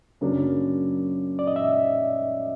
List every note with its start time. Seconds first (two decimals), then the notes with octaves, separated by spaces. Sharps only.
0.21 F#2 C#3 F#3 A#3 D4
1.39 D5
1.47 D#5
1.56 E5